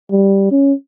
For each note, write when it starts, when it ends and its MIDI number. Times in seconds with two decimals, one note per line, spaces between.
0.11 0.47 55
0.51 0.73 61